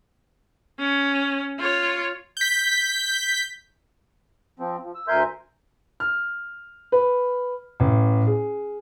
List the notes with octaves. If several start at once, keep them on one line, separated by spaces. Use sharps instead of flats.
C#4
F4 C#5
G6 B6
F3 C4
F3
E6
D2 A#4 E5 G#5 C6 G6
F6
B4
A1
G#4